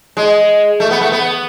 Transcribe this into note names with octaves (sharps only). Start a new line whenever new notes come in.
G#3
A3
B3
A3
B3